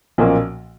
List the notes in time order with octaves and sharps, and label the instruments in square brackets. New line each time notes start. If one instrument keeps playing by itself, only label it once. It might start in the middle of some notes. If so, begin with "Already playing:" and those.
[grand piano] B1 A#2 F3 A#3 C#4